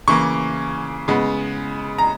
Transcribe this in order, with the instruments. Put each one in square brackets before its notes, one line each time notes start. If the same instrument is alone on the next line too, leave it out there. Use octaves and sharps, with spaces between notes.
[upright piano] C#3 E3 A#3 C#6
C#3 G#3 B3
A#5